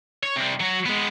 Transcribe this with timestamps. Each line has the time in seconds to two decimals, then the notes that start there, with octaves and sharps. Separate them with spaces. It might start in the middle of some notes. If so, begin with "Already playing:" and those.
0.23 C#5
0.36 C3 G3
0.60 F#3 F#4
0.86 G#3 B3